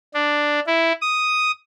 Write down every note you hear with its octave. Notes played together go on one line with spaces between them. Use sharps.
D4
E4
D#6